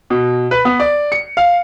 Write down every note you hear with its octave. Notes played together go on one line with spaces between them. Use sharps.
B2
B4
B3
D5
C#7
F5